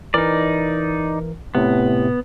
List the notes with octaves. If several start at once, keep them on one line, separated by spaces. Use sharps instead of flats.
E3 D#4 A#4 D5
A2 C3 B3